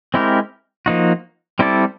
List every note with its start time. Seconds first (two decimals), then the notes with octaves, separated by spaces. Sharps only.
0.14 G#3 C4 E4 G4 A#4
0.86 F3 A#3 D#4 F#4
1.59 G3 C4 E4 A4 D5